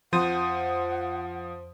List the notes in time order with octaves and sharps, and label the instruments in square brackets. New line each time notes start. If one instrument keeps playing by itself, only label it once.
[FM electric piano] F2 C5 D#6 [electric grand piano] F3 [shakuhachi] F#5